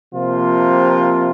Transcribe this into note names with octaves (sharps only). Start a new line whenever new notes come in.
C3 F3 A#3 F4